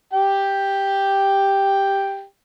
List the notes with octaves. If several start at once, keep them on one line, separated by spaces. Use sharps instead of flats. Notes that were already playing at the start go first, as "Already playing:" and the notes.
G4 G5